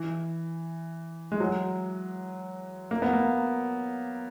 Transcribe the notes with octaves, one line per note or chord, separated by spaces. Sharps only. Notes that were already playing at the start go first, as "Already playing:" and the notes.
Already playing: E3
G#3
F#3
A#3
B3
A#3